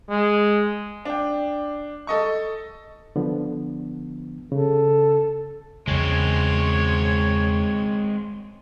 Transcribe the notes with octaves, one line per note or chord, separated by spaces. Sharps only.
G#3
D4 G5
A4 D#5 C#6
D3 F3 B3
C#3 A4
E2 C#3 G#3 C4 C#5